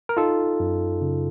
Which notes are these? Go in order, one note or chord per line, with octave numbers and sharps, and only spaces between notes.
A#4
D#4 F4 A4
F#2
C#3